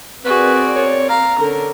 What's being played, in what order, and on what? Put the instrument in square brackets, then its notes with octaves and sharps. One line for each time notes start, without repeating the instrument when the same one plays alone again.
[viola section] C4 A#4 D5 [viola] F#4 G#4 [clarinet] B4
[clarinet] C#5
[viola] F5 [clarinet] A#5
[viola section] D3 C#4 [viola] A#4